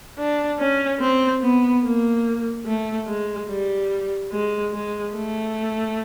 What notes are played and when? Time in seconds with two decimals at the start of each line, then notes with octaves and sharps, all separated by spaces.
0.18 D4
0.59 C#4
1.00 C4
1.42 B3
1.84 A#3
2.66 A3
3.07 G#3
3.48 G3
4.31 G#3
4.73 G#3
5.14 A3